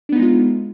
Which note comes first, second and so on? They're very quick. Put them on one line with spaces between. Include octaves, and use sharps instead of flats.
D4 B3 D#4 G#3 F4